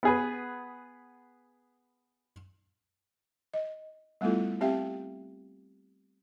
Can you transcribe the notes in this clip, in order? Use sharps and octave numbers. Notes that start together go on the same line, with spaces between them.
B3 G#4 B4
D#5
G3 A3 B3 E4 F4 A4
C4 G4 E5 F5 G5